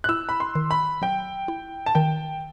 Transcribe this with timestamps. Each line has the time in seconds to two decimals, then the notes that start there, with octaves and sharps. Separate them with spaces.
0.04 F#6
0.09 E4 E6
0.29 B5
0.40 C6
0.55 D#3
0.71 B5
1.02 F#3 G5
1.48 E4
1.86 A5
1.95 D#3 G5